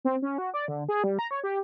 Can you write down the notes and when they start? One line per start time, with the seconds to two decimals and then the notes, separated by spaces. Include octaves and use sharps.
0.05 C4
0.22 C#4
0.38 F#4
0.54 D5
0.68 D3
0.89 G#4
1.04 G3
1.19 A#5
1.31 C#5
1.44 G4